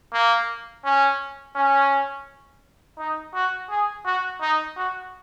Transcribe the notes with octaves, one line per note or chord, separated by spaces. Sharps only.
A#3
C#4
C#4
D#4
F#4
G#4
F#4
D#4
F#4